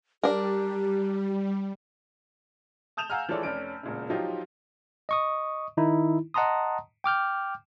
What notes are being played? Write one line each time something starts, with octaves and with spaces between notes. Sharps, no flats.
G3 D4 G4 A#4
A5 D#6 G6 E7 F7
F5 F#5 G#5 A#5 E6 F6
E3 F3 G#3 A4 C#5 D5
F1 C#4 D5 D7
E1 A#2 C#3
F3 F#3 D#4 F4 G4
D#5 C#6 D#6
D#3 D#4 E4
D#5 F#5 A5 A#5 C6 D#6
G5 D6 F6 G6